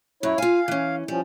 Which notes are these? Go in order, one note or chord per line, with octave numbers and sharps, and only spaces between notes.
F#2 E4 C#5
F4 F5 G#5
E3 C#4
F3 G3 C#4